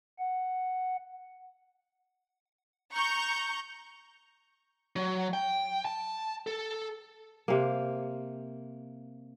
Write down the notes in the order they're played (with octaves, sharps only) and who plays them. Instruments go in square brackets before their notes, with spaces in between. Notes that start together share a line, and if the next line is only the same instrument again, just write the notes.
[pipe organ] F#5
[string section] A#5 C#6 G6
[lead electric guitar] F#3
G5
A5
A4
[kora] C3 A#3